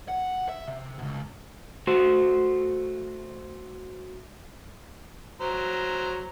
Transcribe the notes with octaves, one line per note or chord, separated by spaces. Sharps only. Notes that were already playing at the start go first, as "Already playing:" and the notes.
F#5
E5
C3
C#2 B2
A3 F#4 C5
F#3 C5 A#5